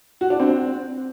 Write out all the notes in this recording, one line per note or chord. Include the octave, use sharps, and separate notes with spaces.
F#4
D4
C4